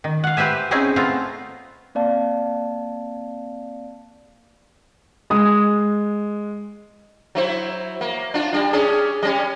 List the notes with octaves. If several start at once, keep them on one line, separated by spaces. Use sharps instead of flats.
D#3
F5 F#5
G4 B4 C5 E5 G#5
C4 C#4 D#4 E4 G#4
A3 B3 C4 F4 A#5
A#3 C4 D5 F5 A5
G#3 D#6
F#3 E4 C5
A#3
D4 F4
G3 D4
C#4 D4 G#4
G3 C#4